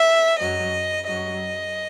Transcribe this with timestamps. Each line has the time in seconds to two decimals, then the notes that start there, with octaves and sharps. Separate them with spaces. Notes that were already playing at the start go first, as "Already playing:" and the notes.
Already playing: E5
0.39 F#2 F#3 D#5
1.07 F#2 F#3 D#5